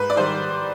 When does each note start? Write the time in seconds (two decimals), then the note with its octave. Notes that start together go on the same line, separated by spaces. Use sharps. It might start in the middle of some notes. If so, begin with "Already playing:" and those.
Already playing: G#2 B4
0.10 D5
0.16 D#3 G3 C5